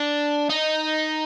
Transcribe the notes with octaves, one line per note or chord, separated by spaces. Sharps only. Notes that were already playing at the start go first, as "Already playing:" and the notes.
Already playing: D4
D#4